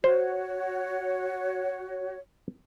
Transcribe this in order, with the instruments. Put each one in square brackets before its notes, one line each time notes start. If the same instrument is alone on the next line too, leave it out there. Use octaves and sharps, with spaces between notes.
[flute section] F#4 C#5 [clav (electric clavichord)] C5